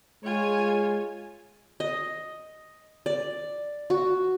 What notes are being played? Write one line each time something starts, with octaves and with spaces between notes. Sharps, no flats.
G#3 F4 C#5 G#5
D#5
D5
F#4